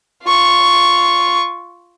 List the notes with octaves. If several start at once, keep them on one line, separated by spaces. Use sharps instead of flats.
F4 C#6